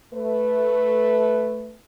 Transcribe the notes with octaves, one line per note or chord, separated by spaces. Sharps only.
A3 B4